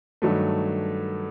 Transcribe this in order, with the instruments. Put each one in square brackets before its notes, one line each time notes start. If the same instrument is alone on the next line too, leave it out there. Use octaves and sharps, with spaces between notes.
[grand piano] G2 D#3 F#3 A3